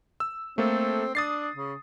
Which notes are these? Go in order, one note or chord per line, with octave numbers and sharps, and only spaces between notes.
E6
A3 A#3 C4 A4
D4 D#6 A6 C7
C#3